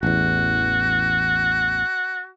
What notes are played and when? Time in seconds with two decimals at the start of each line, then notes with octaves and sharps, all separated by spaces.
0.03 A1 E2 F#4